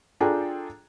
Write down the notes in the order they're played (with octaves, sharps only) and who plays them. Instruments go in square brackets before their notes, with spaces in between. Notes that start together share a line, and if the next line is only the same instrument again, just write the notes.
[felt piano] D4 F4 G#4 A4 G5 A#5